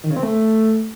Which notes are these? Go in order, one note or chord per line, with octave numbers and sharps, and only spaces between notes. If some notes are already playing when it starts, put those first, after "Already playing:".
D#3
C#3
C4
A3